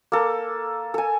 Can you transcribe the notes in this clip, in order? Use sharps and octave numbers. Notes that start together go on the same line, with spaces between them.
A#3 A4
A4 G#5